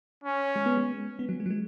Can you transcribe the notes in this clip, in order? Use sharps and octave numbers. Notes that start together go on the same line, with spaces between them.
C#4
G#3
B3
G#3
B3
F#3
G#3
F#3
G#3